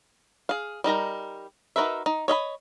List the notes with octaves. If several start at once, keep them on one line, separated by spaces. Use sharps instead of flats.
G#4 F5
G3 D#4 A#4 A#5
D#4 F#4 A#4 B4 E5
D#4
C#5 D#5 E5 B5